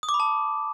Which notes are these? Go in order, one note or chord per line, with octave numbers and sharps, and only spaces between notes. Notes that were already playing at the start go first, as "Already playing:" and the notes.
D#6
D6
B5
A5